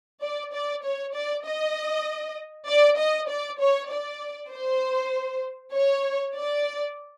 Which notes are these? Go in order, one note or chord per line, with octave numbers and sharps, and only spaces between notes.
D5
D5
C#5
D5
D#5
D5
D#5
D5
C#5
D5
C5
C#5
D5